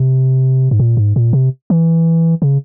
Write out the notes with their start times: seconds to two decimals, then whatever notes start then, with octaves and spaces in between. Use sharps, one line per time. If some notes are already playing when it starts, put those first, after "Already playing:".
Already playing: C3
0.71 G#2
0.79 A#2
0.97 G#2
1.16 A#2
1.33 C3
1.70 E3
2.42 C#3